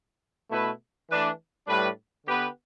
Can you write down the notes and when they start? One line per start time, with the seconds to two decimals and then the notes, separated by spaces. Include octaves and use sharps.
0.49 B2 A3 E4 B4
1.08 E3 A3 D4 B4
1.67 A2 G3 D4 B4
2.26 D3 B3 G4 B4